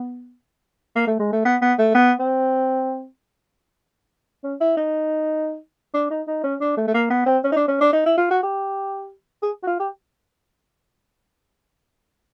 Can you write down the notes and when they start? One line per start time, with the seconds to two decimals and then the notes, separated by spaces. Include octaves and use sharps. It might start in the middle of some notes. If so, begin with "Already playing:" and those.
Already playing: B3
0.96 A#3
1.07 A3
1.19 G#3
1.32 A3
1.45 B3
1.62 B3
1.79 A3
1.94 B3
2.19 C4
4.44 C#4
4.61 E4
4.77 D#4
5.94 D4
6.10 D#4
6.27 D#4
6.44 C#4
6.61 D4
6.77 A3
6.87 A3
6.94 A#3
7.10 B3
7.26 C4
7.44 C#4
7.52 D#4
7.56 D4
7.68 C#4
7.81 D4
7.93 D#4
8.06 E4
8.18 F4
8.31 F#4
8.43 G4
9.42 G#4
9.63 F#4
9.67 F4
9.80 G4